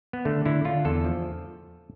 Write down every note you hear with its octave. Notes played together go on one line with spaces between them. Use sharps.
B3
D3 A3
D3 E4
D3 F4
E2 A4
F3